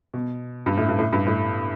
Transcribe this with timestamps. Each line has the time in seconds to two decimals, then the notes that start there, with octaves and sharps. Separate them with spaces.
0.14 B2
0.66 G2
0.77 A2
0.88 G2
0.99 A2
1.13 G2
1.26 A2